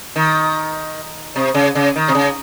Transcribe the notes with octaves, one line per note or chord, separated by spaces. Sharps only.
D#3
C3
C#3
C#3
D#3
C3
C#3